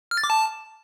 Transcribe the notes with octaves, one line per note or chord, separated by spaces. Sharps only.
F6
A6
D6
A5